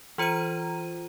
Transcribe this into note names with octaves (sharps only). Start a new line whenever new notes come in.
E3 F4 C5 A#5 D#7